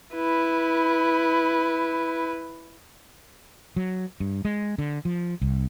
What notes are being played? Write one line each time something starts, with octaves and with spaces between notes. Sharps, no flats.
E4 B4
F#3
G2
G#3
D3
F3
C2